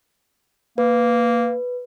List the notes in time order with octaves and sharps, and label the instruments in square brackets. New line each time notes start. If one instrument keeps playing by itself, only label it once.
[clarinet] A#3 [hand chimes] B4